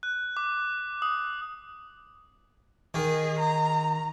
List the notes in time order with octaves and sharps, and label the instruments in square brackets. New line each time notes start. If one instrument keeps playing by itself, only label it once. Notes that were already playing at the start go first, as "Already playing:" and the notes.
[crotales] F#6
D6
D#6
[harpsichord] D#3 [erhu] G#4
[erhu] A#5